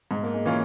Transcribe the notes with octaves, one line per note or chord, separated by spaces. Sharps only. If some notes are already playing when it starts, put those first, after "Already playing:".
G#2 G#3
A#3
G#3
E3 A#3 C#4 F4